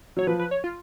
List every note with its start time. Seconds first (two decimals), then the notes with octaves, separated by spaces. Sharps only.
0.17 F#3 C#5
0.27 F3 B4
0.39 B4
0.51 C#5
0.64 F4